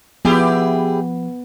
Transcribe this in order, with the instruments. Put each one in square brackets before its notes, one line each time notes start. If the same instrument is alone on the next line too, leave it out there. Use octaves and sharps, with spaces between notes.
[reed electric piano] F3 [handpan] B3 [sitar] E4 G4 G#4